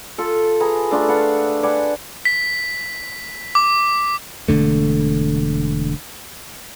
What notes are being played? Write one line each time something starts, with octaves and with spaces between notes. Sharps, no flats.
F4 A4
G#4 B4 A#5
A3 D4 F4
B4 F5 F#5
B4 D5 F#5 G#5
B6
D6
E1 F2 D3 A3